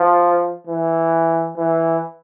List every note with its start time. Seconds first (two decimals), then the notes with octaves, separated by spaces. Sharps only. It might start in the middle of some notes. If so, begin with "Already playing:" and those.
Already playing: F3
0.67 E3
1.57 E3